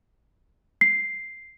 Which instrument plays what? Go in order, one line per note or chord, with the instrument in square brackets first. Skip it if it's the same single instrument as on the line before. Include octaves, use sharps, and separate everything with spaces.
[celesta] C7